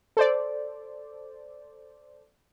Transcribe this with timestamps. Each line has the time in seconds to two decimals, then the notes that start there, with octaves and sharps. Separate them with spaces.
0.17 A4 C5 D5